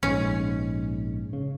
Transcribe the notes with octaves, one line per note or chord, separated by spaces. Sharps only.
A#1 G#2 C#4
C#3